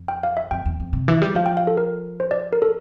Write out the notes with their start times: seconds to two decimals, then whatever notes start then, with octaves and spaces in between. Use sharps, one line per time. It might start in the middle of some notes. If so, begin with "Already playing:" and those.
Already playing: F2
0.08 G5
0.23 F5
0.37 E5
0.51 F2 G5
0.65 E2
0.80 F2
0.93 C3
1.08 E3
1.22 G3
1.35 F3 F5
1.46 G5
1.57 F5
1.67 A4
1.77 A#4
2.20 C5
2.31 D5
2.53 A#4
2.62 A4